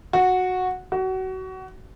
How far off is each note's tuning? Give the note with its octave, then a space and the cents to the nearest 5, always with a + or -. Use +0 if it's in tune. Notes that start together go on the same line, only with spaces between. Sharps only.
F#4 -10
F#4 +25